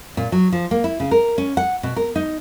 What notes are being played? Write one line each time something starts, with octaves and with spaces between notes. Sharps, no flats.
A#2
F#3
F3
A#3
E4
C#3
A#4
C#4
F#5
B2
A#4
D#4